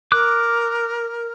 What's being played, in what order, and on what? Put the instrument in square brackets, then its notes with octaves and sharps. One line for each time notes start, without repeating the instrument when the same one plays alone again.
[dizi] A#4 [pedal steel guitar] D6 F#6